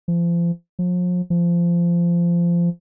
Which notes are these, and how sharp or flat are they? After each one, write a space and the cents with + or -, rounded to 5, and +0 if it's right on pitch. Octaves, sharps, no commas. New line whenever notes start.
F3 -35
F3 +40
F3 -20